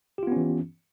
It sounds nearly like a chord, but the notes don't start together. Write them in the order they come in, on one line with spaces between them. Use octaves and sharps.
G4 F4 B3 C#4 E3